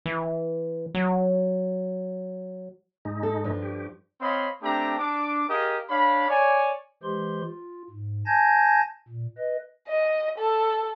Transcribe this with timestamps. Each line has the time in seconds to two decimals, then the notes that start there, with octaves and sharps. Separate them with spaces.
0.06 E3
0.94 F#3
3.05 G#2 G#3 D#4
3.23 A4
3.44 G2 F3
3.62 G4
4.20 C4 C#5 D#5 F5 B5 C6
4.63 A3 C4 D4 G4 A5 A#5
4.99 D4 D6
5.48 G4 G#4 A#4 D#5 F5
5.89 D4 C#5 F5 B5
6.28 C#5 D5 G#5
7.03 E3 G#3 G4 C5 C6
7.43 F4
7.90 G#2
8.26 G#5 A5 G6 G#6 A#6
9.08 A#2
9.38 B4 D#5
9.88 D#5
10.38 A4